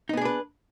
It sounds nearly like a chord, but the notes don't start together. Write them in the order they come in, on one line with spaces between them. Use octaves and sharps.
D#4 B3 G#4 D4 B4